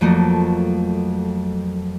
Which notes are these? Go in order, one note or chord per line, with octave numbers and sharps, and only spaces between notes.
F2 F3 F#3 A3 A#3